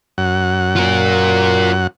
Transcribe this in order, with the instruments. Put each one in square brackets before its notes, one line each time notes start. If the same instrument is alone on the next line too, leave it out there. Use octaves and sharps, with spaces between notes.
[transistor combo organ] F#2 F#5
[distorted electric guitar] F4 A#4